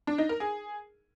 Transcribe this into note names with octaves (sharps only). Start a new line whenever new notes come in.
D4
D#4
A#4
G#4